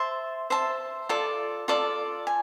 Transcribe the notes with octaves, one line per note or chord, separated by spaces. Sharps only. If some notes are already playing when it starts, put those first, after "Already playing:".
Already playing: C5 E5 A5
C5 E5 A5
F4 A4 D5
F4 A4 D5
G#5